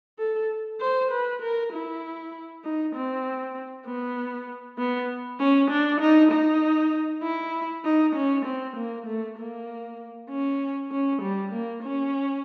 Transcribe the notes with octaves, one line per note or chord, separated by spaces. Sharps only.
A4
C5
B4
A#4
E4
D#4
C4
B3
B3
C#4
D4
D#4
D#4
E4
D#4
C#4
C4
A#3
A3
A#3
C#4
C#4
G3
A#3
C#4